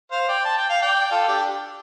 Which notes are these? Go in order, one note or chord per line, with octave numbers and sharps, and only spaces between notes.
C5 F5
D5 G5
A5
G5
F5
D5 G5
F4 A4
D4 G4